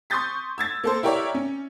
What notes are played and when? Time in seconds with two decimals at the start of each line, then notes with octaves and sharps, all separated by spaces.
0.10 C6 C#6 D#6 G6 A6 B6
0.58 E6 G#6 A6
0.84 A#3 A4 C5
1.03 E4 G4 A#4 C#5 D5 E5
1.34 C#4